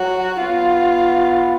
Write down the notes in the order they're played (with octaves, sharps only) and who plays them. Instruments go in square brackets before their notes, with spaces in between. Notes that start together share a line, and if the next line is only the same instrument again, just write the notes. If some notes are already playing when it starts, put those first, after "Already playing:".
Already playing: [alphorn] F#3 [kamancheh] F#4
[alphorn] B3 [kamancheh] F4